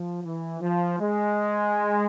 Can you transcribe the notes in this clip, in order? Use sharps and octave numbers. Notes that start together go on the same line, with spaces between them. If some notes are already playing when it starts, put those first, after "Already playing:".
Already playing: F3
E3
F3
G#3